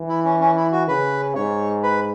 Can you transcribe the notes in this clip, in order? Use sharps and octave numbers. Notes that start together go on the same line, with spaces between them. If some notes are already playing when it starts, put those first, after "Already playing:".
Already playing: E3
E4
C#4
C#4
E4
F#4
C#3 B4
G#2 C#5
B4